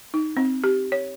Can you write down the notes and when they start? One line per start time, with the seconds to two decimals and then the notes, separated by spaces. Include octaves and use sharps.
0.14 D#4
0.37 C4
0.64 G4
0.92 C#5